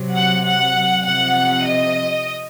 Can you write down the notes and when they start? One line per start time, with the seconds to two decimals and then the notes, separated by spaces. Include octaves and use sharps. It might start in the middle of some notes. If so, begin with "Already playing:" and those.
Already playing: C3 F#3
0.12 F#5
0.43 F#5
1.04 C3 F3 F#5
1.65 D#5